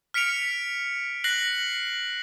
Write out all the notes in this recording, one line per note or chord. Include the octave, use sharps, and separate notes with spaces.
F6 B6 C#7 D7 F7
F#6 A#6 C7 F#7